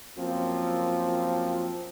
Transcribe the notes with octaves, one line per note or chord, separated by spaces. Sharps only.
F#2 F3 A#3 C4